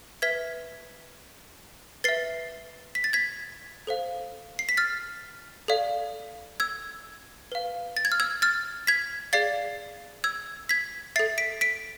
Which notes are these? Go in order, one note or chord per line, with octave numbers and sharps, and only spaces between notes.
B4 E5 G#6 B6
B4 E5 A6 C7
B6
A6
G#6 B6
A4 C5 F5
C7
B6
F6 A6
A4 D5 F5
E6 G#6
B4 F5
A6
G#6
F6
E6 G#6
F6 A6
G#6 B6
G#4 D5 F5 A6 C7
E6 G#6
G#6 B6
A4 E5 A6 C7
B6 D7
B6 D7